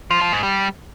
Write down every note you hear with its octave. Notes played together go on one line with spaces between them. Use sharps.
F3
F3
G#2
G3